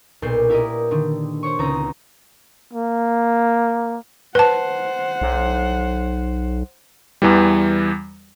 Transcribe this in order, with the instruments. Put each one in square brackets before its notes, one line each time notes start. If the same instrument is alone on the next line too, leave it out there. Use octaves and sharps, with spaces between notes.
[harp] B1 A#2 G6 C7
E4 G4 A#4 D5 D#5
D3 D#3
C5 C#5 C#6
C#2 C4 D#4 A#5
[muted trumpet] A#3
[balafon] B4 A5 [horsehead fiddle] C5 F#5
[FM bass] B1
[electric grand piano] E2 E3 G3